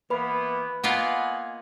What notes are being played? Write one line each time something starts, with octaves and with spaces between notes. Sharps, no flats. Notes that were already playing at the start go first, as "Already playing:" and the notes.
E3 A#3 B3 B4 B5
A#3 B3 F4 D#5 F#5 G#5